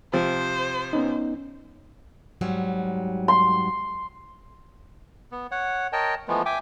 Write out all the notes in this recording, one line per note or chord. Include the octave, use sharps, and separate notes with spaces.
C3 F3 C5
B3 C#4 D#4
G#2 F#3 G3
C6
B3
C#5 F#5
A#4 C#5 D#5 G5 A5
E3 F3 G#3 A3 B3
E5 G5 G#5 D6